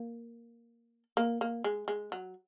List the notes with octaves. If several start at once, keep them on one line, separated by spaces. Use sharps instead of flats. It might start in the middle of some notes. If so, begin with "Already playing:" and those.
Already playing: A#3
A#3
A#3
G#3
G#3
F#3